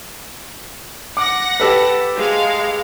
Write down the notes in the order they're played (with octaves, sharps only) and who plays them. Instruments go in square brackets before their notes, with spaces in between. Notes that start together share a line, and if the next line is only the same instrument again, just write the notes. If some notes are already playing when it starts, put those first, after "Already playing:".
[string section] F#5 A#6 [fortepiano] D6
[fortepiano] G4 A4 B4
[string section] G#3 F5